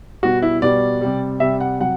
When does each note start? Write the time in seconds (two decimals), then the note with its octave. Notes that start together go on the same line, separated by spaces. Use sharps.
0.23 B2 G3 F#4
0.42 E4
0.62 B2 G3 D5
1.01 C3 G3
1.40 C3 G3 E5
1.60 F#5
1.80 C3 F#3 F#5